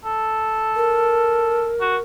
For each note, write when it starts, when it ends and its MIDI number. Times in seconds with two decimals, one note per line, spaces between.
0.05 1.69 69
0.76 2.02 70
1.81 1.96 66